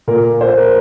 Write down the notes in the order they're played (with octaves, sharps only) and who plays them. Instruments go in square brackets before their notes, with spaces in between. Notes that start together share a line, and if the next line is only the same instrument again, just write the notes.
[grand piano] A#2 A#3 A#4
C5
A#4